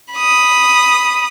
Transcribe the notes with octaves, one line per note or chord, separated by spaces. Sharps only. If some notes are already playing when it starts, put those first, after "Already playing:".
B5 D#6